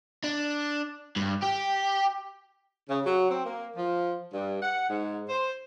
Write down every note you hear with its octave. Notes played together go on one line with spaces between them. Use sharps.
D4
G2
G4
C#3
F#3
C4
A#3
F3
G2
F#5
G#2
C5